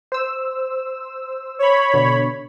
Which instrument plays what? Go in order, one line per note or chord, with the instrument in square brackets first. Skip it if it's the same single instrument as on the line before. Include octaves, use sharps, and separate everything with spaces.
[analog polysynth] C5 E6
[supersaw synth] C#5 B5
[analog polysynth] B2 D3